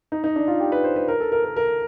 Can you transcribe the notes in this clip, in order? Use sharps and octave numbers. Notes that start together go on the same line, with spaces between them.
D#4
D#4
D4
F4
G4
B4
C5
B4
A#4
A4
A#4
A#4
A#4